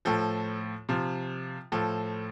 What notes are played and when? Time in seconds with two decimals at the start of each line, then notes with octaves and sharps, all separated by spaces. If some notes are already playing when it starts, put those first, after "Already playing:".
0.05 A2 F3 A4
0.89 C3 F3
1.72 A2 F3 A4